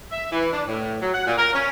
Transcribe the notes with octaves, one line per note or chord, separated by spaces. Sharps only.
E5
E3
D4
A2
F#3
F#5
A#2
A#4
C#4